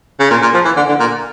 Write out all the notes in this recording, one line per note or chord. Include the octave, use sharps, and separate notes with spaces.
C#3
A#2
A#2
F3
E3
D3
D3
A#2